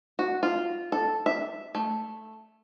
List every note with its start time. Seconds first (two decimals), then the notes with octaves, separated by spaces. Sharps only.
0.19 F#4
0.43 F4
0.92 A4
1.26 E5
1.75 A3